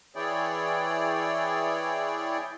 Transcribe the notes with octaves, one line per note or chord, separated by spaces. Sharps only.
E3 E4 G#4 C#5 D5 G5